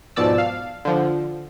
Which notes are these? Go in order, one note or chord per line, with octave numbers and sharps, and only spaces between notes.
G#2 B2 F3 D5 A5 E6
F5
D3 F3